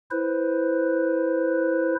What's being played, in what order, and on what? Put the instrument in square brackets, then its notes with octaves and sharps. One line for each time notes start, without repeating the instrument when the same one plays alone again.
[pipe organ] E4 B4 C5